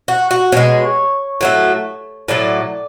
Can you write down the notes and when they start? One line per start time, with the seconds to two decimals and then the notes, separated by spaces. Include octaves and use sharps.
0.08 F#4
0.31 F#4
0.52 B2 G#3 C#5
1.41 A2 F#3 A3
2.28 A2 F#3 A3 D5